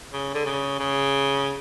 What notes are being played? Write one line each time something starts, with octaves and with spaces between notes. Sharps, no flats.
C#3
D3
C#3
C#3